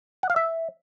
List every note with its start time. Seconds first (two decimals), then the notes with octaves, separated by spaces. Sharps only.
0.23 F#5
0.30 F5
0.36 E5